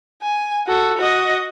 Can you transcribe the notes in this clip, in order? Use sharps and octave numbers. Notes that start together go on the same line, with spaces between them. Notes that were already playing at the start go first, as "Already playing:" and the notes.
G#5
F#4 A4
F#4 D#5